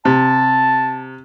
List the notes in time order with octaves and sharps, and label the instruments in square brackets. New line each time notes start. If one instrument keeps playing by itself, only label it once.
[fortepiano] C3 [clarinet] A5